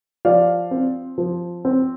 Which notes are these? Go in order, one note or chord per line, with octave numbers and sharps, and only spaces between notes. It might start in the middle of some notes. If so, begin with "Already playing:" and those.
F3 D5 F5
C4
F3
C4